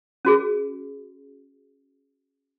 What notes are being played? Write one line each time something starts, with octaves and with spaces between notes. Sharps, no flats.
C#4 F#4 G#4